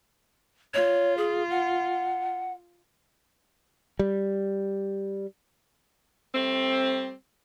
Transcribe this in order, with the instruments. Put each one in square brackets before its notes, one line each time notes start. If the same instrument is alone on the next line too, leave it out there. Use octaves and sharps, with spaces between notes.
[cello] F4 [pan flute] C#5
[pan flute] G#4
F#5
[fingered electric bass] G3
[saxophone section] G3 A3 C4